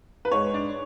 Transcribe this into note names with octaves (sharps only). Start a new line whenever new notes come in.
B4
G#2 C#5
D4